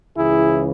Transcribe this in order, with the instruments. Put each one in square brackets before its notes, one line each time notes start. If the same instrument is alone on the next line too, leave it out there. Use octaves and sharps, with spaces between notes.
[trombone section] C#2 C#3 E3 E4 G#4